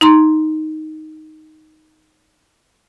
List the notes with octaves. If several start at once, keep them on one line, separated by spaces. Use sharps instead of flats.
D#4 A#5 C6